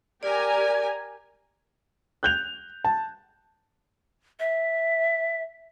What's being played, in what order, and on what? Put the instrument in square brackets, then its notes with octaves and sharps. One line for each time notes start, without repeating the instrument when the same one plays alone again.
[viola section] G4 A#4 G#5 [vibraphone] D5
[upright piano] F#6 G6 F7
A5
[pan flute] E5